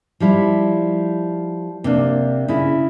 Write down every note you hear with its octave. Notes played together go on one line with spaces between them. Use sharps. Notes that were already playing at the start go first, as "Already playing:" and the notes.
F3 G3 E4
C3 A#3 D4
C#3 E4